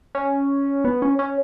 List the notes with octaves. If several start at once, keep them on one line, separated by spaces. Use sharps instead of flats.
C#4
B3
C#4
C#4